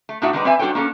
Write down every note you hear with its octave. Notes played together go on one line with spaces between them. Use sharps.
A3
A2 D4 D#4 F#4 E5 F#5
D#3 G#3 D4 D#4 B4 D5
C4 B4 D5 E5 G#5
G3 D4 F#4 A4 C#5 G5
A#3 C#4 D4 A4